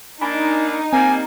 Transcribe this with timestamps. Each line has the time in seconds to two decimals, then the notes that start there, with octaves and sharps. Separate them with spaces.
0.21 A#3 D4 D#4 G#5 A#5 B5
0.93 G3 A#3 C4 G#5